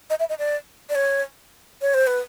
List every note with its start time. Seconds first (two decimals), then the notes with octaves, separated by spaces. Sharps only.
0.10 D#5
0.20 E5
0.29 D#5
0.39 D5
0.90 D5
0.95 C#5
1.82 C#5
1.94 C5
2.07 B4